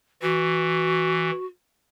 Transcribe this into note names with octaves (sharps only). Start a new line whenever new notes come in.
E3 F#4